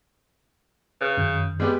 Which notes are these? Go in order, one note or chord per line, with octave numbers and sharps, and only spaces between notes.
C#3 B4 F#6
F#2 D#3 G6
G3 G#3 B3 G4